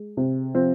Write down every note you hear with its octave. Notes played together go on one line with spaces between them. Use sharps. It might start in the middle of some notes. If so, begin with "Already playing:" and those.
Already playing: G#3
C3
F3 C4